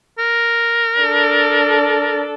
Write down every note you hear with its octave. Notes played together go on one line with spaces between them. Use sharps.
A#4
D4 A4